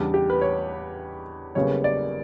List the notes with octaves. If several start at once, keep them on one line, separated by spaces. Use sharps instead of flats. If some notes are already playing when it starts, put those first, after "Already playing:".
Already playing: E2 C#3 G3 D4
G4
B4
C#5
F#1 F#2 C#3 G3 B3 C#5
D5